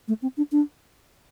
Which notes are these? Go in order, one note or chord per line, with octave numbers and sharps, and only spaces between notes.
A3
C4
D4
D4